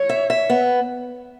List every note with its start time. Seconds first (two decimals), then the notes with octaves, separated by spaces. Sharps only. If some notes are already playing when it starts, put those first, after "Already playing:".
Already playing: C#5
0.09 E5
0.30 E5
0.50 B3